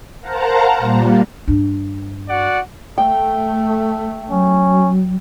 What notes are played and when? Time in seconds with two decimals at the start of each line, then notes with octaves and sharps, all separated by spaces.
0.21 A#4 C5 F5 F#5 A5 A#5
0.78 A#2 G3 A#3
1.48 G2 D4
2.29 F#4 D5 F#5
2.98 A3 G5
4.30 F#3 C#4